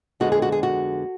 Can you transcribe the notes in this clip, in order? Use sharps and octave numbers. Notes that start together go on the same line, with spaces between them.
F2 D3 G#3 B3 F#4
G#4
F#4
G#4
F#4